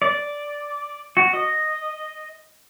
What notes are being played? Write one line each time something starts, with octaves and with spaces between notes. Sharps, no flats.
D5
F#4
D#5